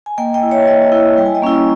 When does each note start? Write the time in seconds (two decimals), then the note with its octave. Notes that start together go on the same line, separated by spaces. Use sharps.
0.06 G#5
0.18 A#3 D#5 G5
0.34 D#5 G5
0.43 E4
0.51 C#5 E5
0.67 A#3 D#5 G5
0.92 E4
1.17 G3 G5
1.26 G#5
1.35 D#5 G5
1.42 A#3 C#4 E4